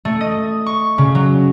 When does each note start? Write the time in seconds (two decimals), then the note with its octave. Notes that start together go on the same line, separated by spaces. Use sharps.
0.05 A3
0.21 D#5
0.66 C#6
0.98 C#3
1.15 F#3